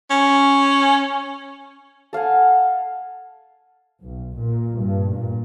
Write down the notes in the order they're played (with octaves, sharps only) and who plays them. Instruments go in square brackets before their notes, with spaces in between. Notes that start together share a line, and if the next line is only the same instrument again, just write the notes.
[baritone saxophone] C#4
[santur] A4 F5 F#5 G#5
[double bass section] B1
A#2
G2
A#2